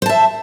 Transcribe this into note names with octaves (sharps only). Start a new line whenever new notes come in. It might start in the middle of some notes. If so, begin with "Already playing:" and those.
C5 E5 A5